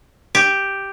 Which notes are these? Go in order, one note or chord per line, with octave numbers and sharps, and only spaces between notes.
G4